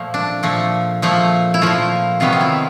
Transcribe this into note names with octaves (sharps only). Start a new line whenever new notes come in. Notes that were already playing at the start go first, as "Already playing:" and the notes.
Already playing: A#2 F3 A3
D4
A#2 F3 A3
A#2 F3 A3
E4
A#2 F3 A3 F4
C3 D#3 F#3 B3 F4
F4
E4